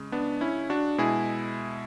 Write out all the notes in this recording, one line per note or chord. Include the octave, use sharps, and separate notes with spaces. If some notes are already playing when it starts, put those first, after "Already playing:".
Already playing: C#3 G#3
B3 D4
C#4 E4
D4 F#4
B2 G#3 E4 G#4